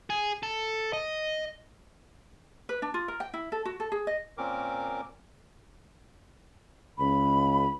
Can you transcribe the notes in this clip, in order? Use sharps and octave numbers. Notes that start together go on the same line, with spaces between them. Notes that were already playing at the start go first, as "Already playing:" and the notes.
G#4
A4
D#5
B4
D4
F4
A#4
G5
E4
A4
F#4
A4
G#4
D#5
A#2 C4 C#4 A#4 D6
C#2 B5